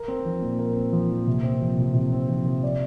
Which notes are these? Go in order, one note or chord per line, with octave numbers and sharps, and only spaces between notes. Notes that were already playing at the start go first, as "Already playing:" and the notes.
Already playing: A#4
C4
F3
A#2
A#4
C4
F3
A#2
C3
C4
F3
C3
C3
C4
F3
C3
D5